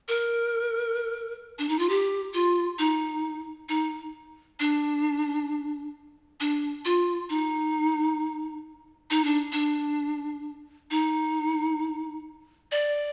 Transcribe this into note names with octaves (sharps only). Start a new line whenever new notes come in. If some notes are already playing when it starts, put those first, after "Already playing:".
A#4
D4
D#4
F4
G4
F4
D#4
D#4
D4
D4
F4
D#4
D#4
D4
D4
D#4
D5